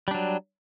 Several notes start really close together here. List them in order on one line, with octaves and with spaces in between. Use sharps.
G3 D4 F#3